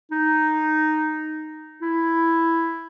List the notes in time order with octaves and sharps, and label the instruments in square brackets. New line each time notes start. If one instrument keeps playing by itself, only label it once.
[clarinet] D#4
E4